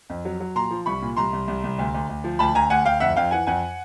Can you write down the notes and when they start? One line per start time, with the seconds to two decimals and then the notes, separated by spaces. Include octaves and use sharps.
0.10 F2
0.25 F#3
0.40 F#3
0.55 A#2 A#5 C6
0.71 F3
0.86 C2 B5 C#6
1.02 A#2
1.16 C2 A#5 C6
1.33 C2
1.48 C2
1.64 C2
1.78 D2
1.94 D2
2.09 D2
2.24 F3
2.39 D2 A5 B5
2.55 D2 G#5 A#5
2.70 D2 F#5 G#5
2.85 D2 F5 G5
3.00 F2 E5 F#5
3.16 F2 F5 G5
3.31 E3 F#5 G#5
3.47 F2 F#5 G#5